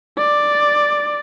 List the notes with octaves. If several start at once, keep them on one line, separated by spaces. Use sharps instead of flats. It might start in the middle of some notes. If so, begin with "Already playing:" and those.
D5